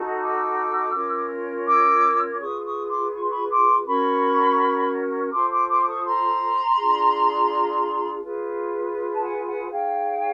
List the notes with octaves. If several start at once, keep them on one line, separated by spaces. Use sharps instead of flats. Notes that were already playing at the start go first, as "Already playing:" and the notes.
Already playing: D#4 F#4 A4
D6 E6
C#4 F4 A#4 C#5
D6 E6
D6
F4 G#4 B4 C#6 D#6
C#6 D#6
C6 D6
C#6
C6
B5 C#6
C6 D6
C#4 F#4 A#4 B5 C#6
F4 A4 C5 C6 D6
C6 D6
C6 D6
D6
C#6 D#6
A#5 C6
D4 F4 G#4
F4 G#4 B4
A5
F#5 G#5
F#5 G#5
D#4 G#4 C#5 F5 G5